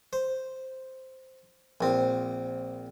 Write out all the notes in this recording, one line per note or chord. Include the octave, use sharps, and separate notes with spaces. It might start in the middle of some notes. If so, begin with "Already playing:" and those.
C5
A#1 C4